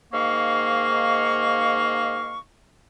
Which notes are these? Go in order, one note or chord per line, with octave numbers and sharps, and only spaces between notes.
G#2 D#3 A#3 F5 C#6